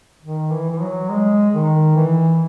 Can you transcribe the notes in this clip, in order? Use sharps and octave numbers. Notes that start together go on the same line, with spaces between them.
D#3
E3
E3
F#3
G#3
D#3
E3